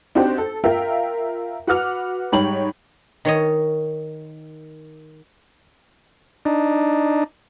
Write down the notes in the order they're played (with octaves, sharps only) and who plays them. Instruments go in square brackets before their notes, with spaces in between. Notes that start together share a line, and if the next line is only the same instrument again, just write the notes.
[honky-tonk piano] C4 D4 D#4 F#4 G4 C5
A4
F4 A#4 E5 F5 G5
F#4 B4 F#5 D6 F6
G#2 G3 C#5 G5 B5 F#7
[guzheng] D#3 C#5 D#5
[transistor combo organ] D4 D#4